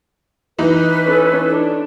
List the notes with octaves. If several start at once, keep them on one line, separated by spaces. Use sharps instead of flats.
E3 D#4 B4
C#4 A4
D4